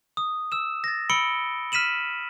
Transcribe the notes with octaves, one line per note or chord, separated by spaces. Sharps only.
D#6
E6 E7
A6 A#6
B5 E6 C#7 D7 G7
F6 B6 D#7 E7 F#7